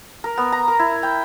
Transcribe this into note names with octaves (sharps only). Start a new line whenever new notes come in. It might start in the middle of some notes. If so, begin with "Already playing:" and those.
A#4
B3
A#5
A#4
E4
G5